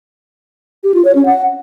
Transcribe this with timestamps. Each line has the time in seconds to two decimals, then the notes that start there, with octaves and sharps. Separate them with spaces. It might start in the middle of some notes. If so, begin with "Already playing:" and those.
0.84 G4
0.94 F4
1.05 C#5
1.15 C#4
1.26 F#5